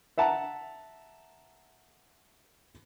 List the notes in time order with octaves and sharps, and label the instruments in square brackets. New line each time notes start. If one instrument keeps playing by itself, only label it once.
[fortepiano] E5 F#5 A5 A#5